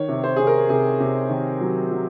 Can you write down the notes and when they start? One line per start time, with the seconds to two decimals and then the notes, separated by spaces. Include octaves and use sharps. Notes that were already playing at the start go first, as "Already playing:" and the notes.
Already playing: D#3 C#5
0.08 C3
0.24 C5
0.36 C3 G#4
0.47 A#4
0.69 C3 G#4
1.00 C3
1.30 D#3
1.61 F#3
1.91 F#3